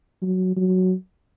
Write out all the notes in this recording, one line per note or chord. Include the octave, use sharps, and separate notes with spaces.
F#3
F#3